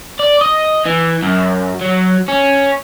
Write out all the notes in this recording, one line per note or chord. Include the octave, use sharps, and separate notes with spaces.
D5
D#5
E3
F#2
F#3
C#4